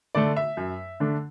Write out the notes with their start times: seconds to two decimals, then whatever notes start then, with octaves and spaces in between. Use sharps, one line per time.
0.15 D3 A3 D5
0.36 E5
0.57 F#2
1.00 D3 A3 D4